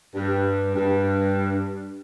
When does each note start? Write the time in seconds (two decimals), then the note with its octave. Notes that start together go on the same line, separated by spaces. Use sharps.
0.15 G2
0.75 G2